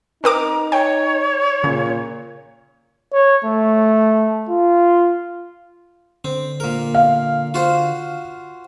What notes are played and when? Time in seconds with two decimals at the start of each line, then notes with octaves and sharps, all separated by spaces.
0.24 C4 D#4 A#4 A#5 D6
0.72 C#5 G5
1.64 A#2 C#3
3.13 C#5
3.45 A3
4.49 F4
6.25 D3 C4
6.60 A#2 A#4
6.94 F5
7.54 F4 F#4 C5